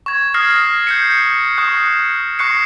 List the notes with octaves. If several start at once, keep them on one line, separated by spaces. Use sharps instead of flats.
C#6 G#6
D#6 F6 G#6 A#6 C7
G6 C7 C#7
C#6 D#6 F#6 C#7
C#6 F#6 C7 C#7